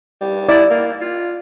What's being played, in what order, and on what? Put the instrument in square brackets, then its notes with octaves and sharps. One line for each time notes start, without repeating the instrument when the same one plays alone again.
[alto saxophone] G3
[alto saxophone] E4 [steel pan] D5
[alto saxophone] A#3
F4